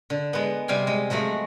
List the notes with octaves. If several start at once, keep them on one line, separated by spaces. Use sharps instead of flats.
D3
G#3 B3
C3 G3 F5 G5 G#5
G#3
F3 F#3 G#3 A3